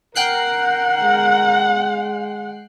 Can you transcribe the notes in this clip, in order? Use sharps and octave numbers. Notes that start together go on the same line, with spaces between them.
A#4 F#5 G5 F#6 C7
G#3